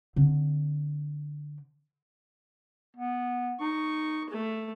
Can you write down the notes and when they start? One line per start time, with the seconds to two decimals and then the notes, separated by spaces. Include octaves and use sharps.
0.16 D3 C4
2.97 B3
3.60 D#4 C#6
4.30 A3